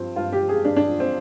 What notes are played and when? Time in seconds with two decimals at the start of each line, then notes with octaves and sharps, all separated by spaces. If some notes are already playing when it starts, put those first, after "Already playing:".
Already playing: G2 F3 C4
0.16 G2 F4
0.33 G4
0.41 F3
0.49 G#4
0.65 G2 D4
0.76 D4
0.88 F3
1.00 C4